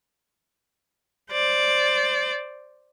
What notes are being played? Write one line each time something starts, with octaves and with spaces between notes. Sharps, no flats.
C5 D5